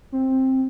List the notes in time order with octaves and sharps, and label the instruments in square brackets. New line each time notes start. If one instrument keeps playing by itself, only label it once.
[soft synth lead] C4